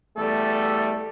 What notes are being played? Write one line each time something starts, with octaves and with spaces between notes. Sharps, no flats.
E2 G3 A3 A4